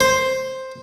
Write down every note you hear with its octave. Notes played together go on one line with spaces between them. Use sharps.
C5